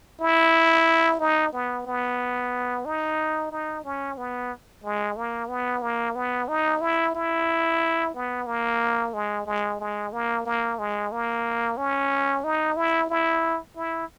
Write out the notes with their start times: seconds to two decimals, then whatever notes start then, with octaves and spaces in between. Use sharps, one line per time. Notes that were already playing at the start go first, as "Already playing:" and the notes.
0.20 E4
1.20 D#4
1.53 B3
1.86 B3
2.85 D#4
3.52 D#4
3.84 C#4
4.18 B3
4.84 G#3
5.17 A#3
5.49 B3
5.82 A#3
6.15 B3
6.48 D#4
6.81 E4
7.15 E4
8.14 B3
8.47 A#3
9.14 G#3
9.46 G#3
9.80 G#3
10.13 A#3
10.46 A#3
10.79 G#3
11.12 A#3
11.77 C#4
12.44 D#4
12.77 E4
13.10 E4
13.77 E4